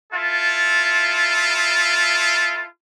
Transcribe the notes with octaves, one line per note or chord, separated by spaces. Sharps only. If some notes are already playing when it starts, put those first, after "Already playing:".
E4 F4 A4